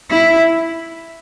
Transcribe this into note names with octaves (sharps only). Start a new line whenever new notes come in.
E4